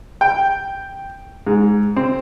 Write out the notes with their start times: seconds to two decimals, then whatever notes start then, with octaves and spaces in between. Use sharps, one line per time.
0.21 G5
1.47 G#2
1.96 C4